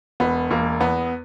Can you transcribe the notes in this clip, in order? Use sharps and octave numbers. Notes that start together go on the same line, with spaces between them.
E1 B3
E1 A#3
E2 B3